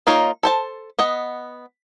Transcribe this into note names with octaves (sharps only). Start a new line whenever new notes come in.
A#3 D#4 F4 A#4 C#5
A4 C5 A5
B3 D#5 F#5